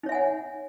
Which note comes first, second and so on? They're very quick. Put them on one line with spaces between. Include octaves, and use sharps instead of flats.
D#4 C#5 E5 G#5 F#5